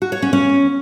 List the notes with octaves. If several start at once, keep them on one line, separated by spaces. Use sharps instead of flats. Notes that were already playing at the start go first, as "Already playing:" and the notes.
F#4
C#5
C#4
C#4